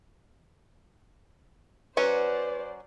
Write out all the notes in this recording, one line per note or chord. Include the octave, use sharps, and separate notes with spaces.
F#3 C#4 F#4 B4 C5 D5